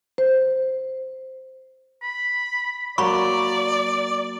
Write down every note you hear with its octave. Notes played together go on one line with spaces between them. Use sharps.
C5
B5
F#3 A#3 D5 B5 C#6